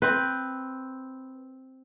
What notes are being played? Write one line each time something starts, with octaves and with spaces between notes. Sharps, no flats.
C4 B4